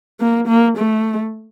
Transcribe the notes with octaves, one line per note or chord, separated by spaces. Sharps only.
A#3
A#3
A3